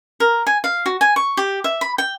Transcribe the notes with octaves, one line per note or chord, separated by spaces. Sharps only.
A#4
G#5
F5
F#4
G#5
C#6
G4
E5
B5
G5